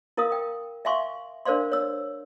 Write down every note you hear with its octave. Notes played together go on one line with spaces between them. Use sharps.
E4 A#4 F5 D#6
G5
E5 F5 G#5 C6 C#6
D4 A#4 C5 D5 F5 C6
C#5 E6